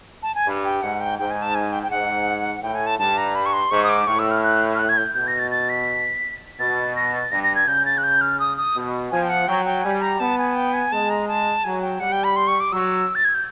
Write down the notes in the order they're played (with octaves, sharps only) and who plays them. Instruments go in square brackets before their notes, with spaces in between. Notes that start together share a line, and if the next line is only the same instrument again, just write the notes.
[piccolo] A5
G#5
[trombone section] G2
[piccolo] G5
[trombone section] G#2 [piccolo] F#5
[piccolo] G5
[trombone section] G#2 [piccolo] G5
[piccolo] G#5
A5
G#5
G5
G5
[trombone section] G#2 [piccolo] F#5
[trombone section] A2 [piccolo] G5
[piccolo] G#5
A5
[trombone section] G2 [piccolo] A5
[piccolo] A#5
B5
C#6
C6
[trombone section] G#2 [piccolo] C#6
[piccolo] D#6
D6
[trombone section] A2 [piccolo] C#6
[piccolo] E6
F6
F#6
F6
F#6
G#6
G6
[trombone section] B2 [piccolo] G6
[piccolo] A#6
A6
A6
B6
[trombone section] B2 [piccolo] A6
[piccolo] A#6
A6
[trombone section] G2 [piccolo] A#6
[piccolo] A#6
G#6
[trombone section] C#3 [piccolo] G6
[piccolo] A6
F#6
G6
F6
D#6
D#6
[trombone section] B2
[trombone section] F3 [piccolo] G#5
[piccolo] G5
F#5
[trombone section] F#3 [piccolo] G5
[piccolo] G5
[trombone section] G3 [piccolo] G#5
[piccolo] A#5
[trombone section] B3 [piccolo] A5
[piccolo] G#5
G5
G#5
[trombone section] G#3 [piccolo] A5
[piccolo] A#5
A5
[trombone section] F#3 [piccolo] G#5
[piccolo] G5
[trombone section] G3 [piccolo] F#5
[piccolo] G5
B5
C6
C#6
D6
[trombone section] F#3 [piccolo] E6
[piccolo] A6
G#6
G6